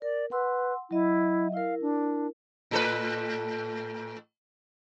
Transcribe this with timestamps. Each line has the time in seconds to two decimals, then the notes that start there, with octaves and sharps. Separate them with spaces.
0.02 A#4 D5
0.31 B4 F#5 C6 E6
0.91 F#3 E4 D#5 E5
1.54 E4 A#4 F5
1.82 D4
2.71 A2 A4 B4